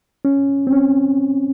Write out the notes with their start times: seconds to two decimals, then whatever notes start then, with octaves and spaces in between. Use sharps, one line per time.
0.25 C#4
0.67 C4
0.72 C#4